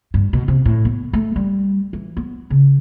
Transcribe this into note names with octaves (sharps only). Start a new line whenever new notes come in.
G2
B2
C3
A2
B3
A3
G3
E3
B3
C#3